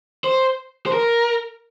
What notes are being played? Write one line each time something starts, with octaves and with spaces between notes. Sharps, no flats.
C5
C5
A#4